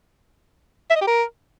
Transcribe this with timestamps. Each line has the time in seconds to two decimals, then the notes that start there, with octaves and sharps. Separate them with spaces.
0.90 E5
0.96 D#5
1.01 G4
1.07 A#4